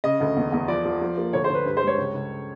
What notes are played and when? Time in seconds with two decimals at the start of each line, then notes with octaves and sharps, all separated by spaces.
0.04 C#3 D#5
0.20 D2
0.37 E2
0.52 E2
0.68 F3 D5
0.85 F3
1.01 F3
1.18 A#3
1.33 D2 C#5
1.44 C5
1.49 D2 B4
1.65 G2 B4
1.77 C5
1.83 G#3 C#5
1.98 C#2
2.14 C#2